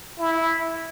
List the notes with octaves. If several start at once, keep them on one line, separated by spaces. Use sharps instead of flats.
E4